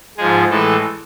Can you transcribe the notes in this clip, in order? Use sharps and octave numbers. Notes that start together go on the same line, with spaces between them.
G#2 F3 G#3 G#4
A2 E3 G#3 A4